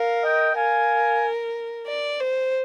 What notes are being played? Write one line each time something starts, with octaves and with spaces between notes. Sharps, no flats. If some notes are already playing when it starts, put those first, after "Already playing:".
Already playing: A#4 F5
D#5 G5
A#4 F5 G#5
D5
C5